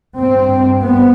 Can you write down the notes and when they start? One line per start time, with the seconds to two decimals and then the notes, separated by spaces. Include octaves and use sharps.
0.18 G2 C4
0.81 B3